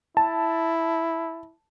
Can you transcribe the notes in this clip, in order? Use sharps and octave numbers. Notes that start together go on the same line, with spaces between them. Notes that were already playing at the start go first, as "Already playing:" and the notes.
E4 A5